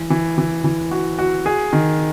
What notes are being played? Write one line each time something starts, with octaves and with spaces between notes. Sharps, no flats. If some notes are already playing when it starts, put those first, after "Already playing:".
Already playing: E3
E3
E3
E3
F#4
F#4
G#4
D#3